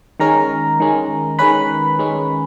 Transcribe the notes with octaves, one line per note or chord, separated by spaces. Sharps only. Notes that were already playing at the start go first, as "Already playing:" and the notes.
D#3 G#3 C#4 A#4 A#5
D#3 G#3 C#4
D#3 G#3 C#4 B4 B5
D#3 G#3 C#4